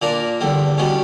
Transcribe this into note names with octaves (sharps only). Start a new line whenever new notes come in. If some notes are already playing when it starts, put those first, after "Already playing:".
A#2 A#3 D4 A#4
E2 D3 G3
B2 G3 C#4